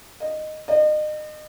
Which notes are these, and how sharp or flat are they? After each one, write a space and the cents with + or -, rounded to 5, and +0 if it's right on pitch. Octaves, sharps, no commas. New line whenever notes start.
D#5 -10
D#5 -35